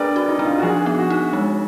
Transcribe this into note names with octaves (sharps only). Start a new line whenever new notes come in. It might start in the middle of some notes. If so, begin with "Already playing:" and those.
Already playing: D4 G#4 A#4 B4 D5
F#4
D#4
D4 D#4
F4
F#4
F3 G#4
B3
F#4
D#4
G#3